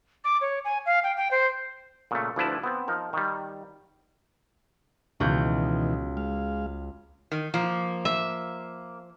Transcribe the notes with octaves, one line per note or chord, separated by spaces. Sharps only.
D6
C#5
G#5
F5
G5
G5
C5
A#2 C#3 A3
D2 F3 D4 E4 B4 A5
B3 C4
F3 D#4 A#4
D#3 G3
C#2 B2 D#3 E3 F#4 G6
G#3 F5
D#3
F3 A#3
E5